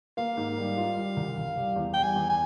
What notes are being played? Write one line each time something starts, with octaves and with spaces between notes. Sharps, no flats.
A#3 F5
G#2
G3
F4
G3
C2
C2
G3
E2
G3 G5
G#5
E2
G#5